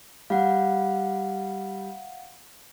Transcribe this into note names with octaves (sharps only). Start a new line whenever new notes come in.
G3 F5 F#5